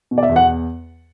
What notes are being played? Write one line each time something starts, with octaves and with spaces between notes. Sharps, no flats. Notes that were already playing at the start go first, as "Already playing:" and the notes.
B2
D5
E5
E2
F#5